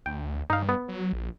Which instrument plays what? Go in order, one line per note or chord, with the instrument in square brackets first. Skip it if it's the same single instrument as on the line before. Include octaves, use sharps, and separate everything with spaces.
[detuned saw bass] D2 [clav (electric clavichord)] G5
[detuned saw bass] G2 [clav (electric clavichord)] D#4 F5
[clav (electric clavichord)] B3
[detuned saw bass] F#3
A#1